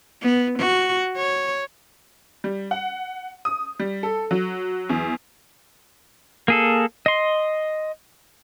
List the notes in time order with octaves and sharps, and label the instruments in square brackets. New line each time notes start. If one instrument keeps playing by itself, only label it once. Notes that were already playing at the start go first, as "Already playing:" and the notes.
[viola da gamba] B3
F#4
C#5
[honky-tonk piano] G3
F#5
D#6
G3
A4
F#3
E2
[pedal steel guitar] A#3 G#4 A4
D#5 C6